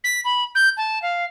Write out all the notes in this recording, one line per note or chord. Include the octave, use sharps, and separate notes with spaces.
B6
B5
G6
A5
F5